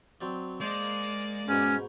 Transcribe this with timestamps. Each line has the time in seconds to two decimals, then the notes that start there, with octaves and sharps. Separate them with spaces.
0.21 F#3 C4 D5
0.61 G#3 A#3 C5 D5 D#5 A5
1.48 G#2 B2 C#4